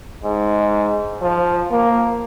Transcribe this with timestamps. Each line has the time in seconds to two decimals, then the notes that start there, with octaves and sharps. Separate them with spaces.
0.24 G#2
1.22 F3
1.71 A#3